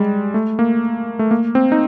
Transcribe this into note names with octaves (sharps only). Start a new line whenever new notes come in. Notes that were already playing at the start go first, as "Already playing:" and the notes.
Already playing: G3 G#3
A3
A#3
A3
A#3
C4
D#4